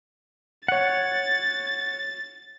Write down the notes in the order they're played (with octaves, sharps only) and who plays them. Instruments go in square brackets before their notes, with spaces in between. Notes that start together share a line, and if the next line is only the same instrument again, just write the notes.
[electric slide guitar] C#5 F#5 [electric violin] A6